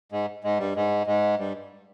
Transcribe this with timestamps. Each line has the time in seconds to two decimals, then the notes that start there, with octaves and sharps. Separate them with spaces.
0.12 G#2 G#3
0.44 G#2 G#3
0.59 G2 G3
0.76 G#2 G#3
1.07 G#2 G#3
1.38 G2 G3